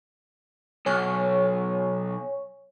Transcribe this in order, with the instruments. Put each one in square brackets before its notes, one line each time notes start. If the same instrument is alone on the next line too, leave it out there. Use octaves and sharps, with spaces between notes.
[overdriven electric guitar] B1 [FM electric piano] C#5 G#5 C#6